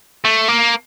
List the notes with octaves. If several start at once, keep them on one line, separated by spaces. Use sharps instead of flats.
A3
A#3